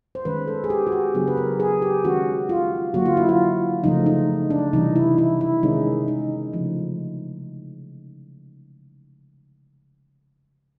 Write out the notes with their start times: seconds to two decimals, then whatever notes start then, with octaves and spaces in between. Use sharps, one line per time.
0.15 C5
0.25 D#3 G#3 C#4 B4
0.48 A4
0.64 G#4
0.70 G4
0.87 F#4
0.92 G4
1.14 C#3 F#3 B3 D4 G#4
1.28 B4
1.37 A#4
1.60 G#4
1.82 G4
2.04 D#3 G#3 C#4 F#4
2.49 F4
2.94 D3 F#3 A#3 F#4
3.06 F4
3.17 E4
3.29 F4
3.84 C#3 F3 A3 D#4
4.06 D#4
4.50 D4
4.73 C3 E3 G3 D#4
4.96 E4
5.18 E4
5.41 E4
5.63 C3 D#3 G#3 C#4 D#4
6.08 D#4
6.53 C#3 F3 A3